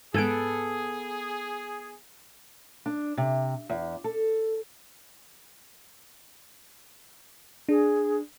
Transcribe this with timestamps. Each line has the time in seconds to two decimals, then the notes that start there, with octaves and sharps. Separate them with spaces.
0.14 G#2 B3 G#4 A4 G#5 D7
2.86 D4
3.17 C3
3.69 E2
4.04 A4
7.69 D4 G#4